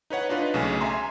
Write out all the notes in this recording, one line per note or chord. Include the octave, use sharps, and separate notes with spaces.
D#4 B4 C#5 F#5
D4 D#4 F4 B4
B1 C#3 A3 G#5
E5 G#5 A#5 C6